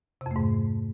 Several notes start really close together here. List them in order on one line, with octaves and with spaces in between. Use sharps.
C3 F2 A3 G#2